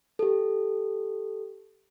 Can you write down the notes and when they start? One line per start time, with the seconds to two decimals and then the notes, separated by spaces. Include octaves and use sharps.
0.19 G4 A4